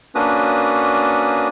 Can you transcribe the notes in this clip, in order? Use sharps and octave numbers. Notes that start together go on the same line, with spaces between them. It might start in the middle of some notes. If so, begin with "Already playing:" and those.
A#3 C#4 D4 F#4 B4 D#6